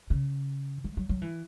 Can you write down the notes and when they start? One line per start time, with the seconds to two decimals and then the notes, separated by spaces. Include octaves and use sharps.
0.10 C#3
0.84 F#3
0.97 F#3
1.09 F#3
1.22 E3